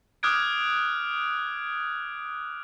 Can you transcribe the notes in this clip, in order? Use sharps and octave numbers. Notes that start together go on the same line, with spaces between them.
D6 D#6 F6 F#6 G#6 D7